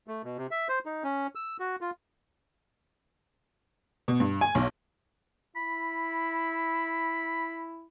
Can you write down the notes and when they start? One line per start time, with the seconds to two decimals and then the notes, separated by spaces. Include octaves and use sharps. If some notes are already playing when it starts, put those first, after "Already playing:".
0.08 A3
0.24 B2
0.37 C3
0.51 E5
0.69 C5
0.86 D#4
1.04 C#4
1.35 E6
1.60 F#4
1.81 F4
4.08 B2
4.20 G2
4.41 G#5
4.55 B1
5.56 E4 B5